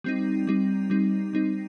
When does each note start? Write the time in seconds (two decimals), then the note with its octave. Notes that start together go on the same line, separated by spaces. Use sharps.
0.04 G3 C4 D#4
0.47 G3 C4 D#4
0.90 G3 C4 D#4
1.33 G3 C4 D#4